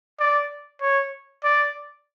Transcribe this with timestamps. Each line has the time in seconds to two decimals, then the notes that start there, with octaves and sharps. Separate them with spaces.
0.20 D5
0.82 C#5
1.44 D5